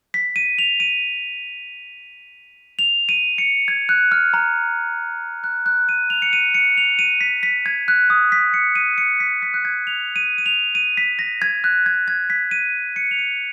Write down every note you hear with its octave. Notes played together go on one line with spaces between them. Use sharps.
B6
D#7
F7
D#7
F7
D#7
C#7
G#6
F#6
F6
A#5
F#6
F#6
D#7
F7
C#7
D#7
C#7
F7
D#7
B6
B6
G#6
F#6
D#6
B6
C#7
D#7
C#7
B6
B6
F#6
G#6
F7
D#7
D#7
F7
D#7
B6
A#6
G#6
F#6
G#6
G#6
B6
D#7
C#7
F7
D#7